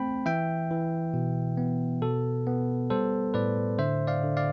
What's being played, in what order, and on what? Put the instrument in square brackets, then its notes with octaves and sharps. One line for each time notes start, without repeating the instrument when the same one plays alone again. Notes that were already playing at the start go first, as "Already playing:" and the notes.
Already playing: [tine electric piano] A3 C4 G5 B5
E3 E5 G5
E3
B2
B3
B2 A4
B3
G3 A4 C5
A2 B4 D5
D3 C5 E5
D5 F5
D3
D5 F5